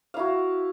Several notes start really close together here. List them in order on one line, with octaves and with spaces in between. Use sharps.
F5 E4 F#4